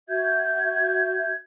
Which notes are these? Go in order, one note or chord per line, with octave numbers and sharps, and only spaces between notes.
F#4 E5 G6 G#6